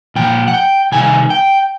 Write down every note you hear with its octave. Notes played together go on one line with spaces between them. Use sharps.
A#2 F3 G5
F#5
G5
C3 D#3 G3 B3 G#5
G5